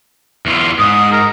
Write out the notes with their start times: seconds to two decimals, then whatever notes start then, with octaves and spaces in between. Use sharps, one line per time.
0.46 E2 E3 F4
0.79 G#2 D#6
1.13 A#4